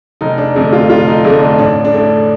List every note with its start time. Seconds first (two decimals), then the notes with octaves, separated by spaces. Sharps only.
0.21 F1 D#4
0.38 D4
0.55 F2 D3 A3
0.73 F4
0.90 F1 F4
1.07 D#4
1.24 F2 D3 A3 D4
1.41 D4
1.59 A1 D4
1.85 D4
1.94 A2 A3